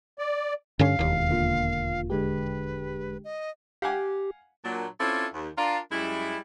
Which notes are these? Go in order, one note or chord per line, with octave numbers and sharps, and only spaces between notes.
D5
G2 D3 C#4 F5
E1 D#2
D3 A#3 F4
D3 G#3 G4 B4
D#5
G4 F5 F#5 G#5
A#2 F#3 D4
C4 C#4 E4 F4 A4 D5
D#2
D4 F4 A#4
F#2 G3 G#3 E4